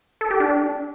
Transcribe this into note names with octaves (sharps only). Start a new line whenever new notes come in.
A4
G4
D4